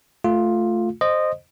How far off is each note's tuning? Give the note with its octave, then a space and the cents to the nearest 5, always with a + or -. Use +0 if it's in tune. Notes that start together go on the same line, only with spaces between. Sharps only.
A3 +0 F4 +5
C5 +0 D#5 -15